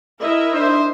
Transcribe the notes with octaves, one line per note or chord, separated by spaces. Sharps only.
E4 A#4 D#5 E5
D4 D#4 C5